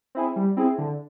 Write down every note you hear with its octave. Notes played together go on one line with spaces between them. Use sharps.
C4 E4 G#4
G3
C4 E4 G#4
D3